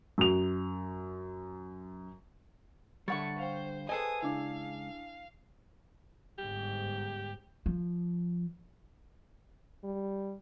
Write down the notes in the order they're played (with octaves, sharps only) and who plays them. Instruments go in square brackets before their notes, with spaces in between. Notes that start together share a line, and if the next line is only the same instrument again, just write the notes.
[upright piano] F#2 F7
[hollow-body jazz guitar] D3 G3 [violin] A3 [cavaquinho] C#5 F#5 C#6 [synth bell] A6
[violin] C5 [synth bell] F5 G5
[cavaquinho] G#4 A4 G#5 [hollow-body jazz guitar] B4 C5 D#5 [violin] D#6
[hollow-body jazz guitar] C#2 [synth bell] D4 E4 [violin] F5
[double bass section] G1 G#2 [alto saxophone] G4
[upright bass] F3
[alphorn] G3